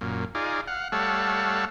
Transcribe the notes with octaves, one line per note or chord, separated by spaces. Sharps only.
F#2 A#2
D#4 F4 G#4 D5
F5 F#5
G3 A3 A4 C#5 F5 F#5